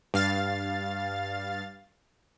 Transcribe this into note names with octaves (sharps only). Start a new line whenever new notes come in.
G2 F5 A6